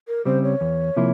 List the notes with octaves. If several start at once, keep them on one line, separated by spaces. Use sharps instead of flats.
A#4
C#3 G3 C4 C5
C#5
E2
C3 F3 A#3 E4